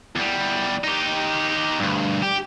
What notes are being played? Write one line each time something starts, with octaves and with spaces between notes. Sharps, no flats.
E2 G3
D#4 G4
D2 G2
G4